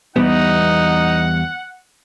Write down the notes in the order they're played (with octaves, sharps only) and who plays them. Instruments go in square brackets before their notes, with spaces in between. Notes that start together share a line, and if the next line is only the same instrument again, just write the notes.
[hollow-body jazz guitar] E2 G3 B3 [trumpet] D#4 [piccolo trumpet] F#5